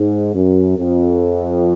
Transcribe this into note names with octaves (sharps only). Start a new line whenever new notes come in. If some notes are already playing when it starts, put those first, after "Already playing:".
Already playing: G#2
F#2
F2